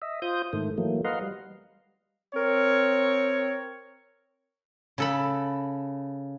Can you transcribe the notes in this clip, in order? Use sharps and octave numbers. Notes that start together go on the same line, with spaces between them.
D#5 E5
F4 C5 D#6 G6
G#2 D#3 A3
E3 F#3 A3 A#3
B4 D#5 F5 F#5 A#5 C6
G3
C4 A#4 C#5
C#3 A4 B5